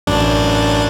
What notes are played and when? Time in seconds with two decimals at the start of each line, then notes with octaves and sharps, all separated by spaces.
0.07 A1 F#2 D4